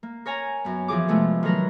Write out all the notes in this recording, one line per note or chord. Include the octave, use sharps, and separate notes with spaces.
A#3
A#4 C#5 G#5 A#5
F#2 B3
E3 F3 G#4 D6
C3 F3 G#3 A3 B3
D#3 F#3 A3 A#4 B4